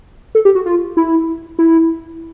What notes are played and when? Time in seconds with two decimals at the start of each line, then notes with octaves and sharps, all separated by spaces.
0.35 A4
0.45 G4
0.55 F#4
0.66 F4
0.97 E4
1.59 E4